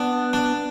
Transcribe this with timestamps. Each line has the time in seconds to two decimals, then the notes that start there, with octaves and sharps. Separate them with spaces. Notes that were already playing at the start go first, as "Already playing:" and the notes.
Already playing: B3 D4
0.33 D4